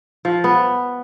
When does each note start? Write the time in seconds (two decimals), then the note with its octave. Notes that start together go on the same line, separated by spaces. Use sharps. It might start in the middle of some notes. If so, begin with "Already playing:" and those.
0.25 F3
0.44 B3